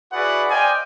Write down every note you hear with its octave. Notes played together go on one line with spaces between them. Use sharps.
E4 F#4 G#4 B4 D5 F#5
C5 D5 D#5 F5 G5 G#5